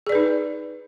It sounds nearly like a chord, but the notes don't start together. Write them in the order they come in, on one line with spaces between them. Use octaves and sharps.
G#4 D5 B4 D#4